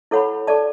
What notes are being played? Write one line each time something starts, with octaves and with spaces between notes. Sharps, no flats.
E4 A4 C#5 F#5 B5
A4 D5 A5